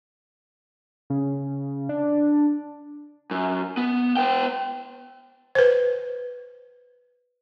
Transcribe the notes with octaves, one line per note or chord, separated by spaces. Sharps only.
C#3
D4
F#2
B3
B3 G5
B4 C5